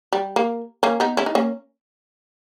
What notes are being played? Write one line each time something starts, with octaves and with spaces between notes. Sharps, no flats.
G3
A#3
A#3 C#4
B3 D#4
C#4 E4
D#4
A#3 C#4